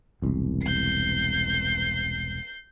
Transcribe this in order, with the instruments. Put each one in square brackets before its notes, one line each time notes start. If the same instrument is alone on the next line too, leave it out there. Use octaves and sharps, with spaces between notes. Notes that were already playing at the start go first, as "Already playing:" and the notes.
[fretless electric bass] E1 C2
[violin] G6 C7